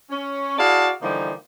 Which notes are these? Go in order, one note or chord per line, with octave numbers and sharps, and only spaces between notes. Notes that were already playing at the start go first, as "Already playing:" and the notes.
C#4
E4 F#4 G#4 D5 F5 A5
D3 E3 F3 G3 A#3 D#4